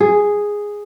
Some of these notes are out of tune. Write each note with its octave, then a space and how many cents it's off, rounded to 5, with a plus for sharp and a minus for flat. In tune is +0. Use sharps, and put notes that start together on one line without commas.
G#4 -5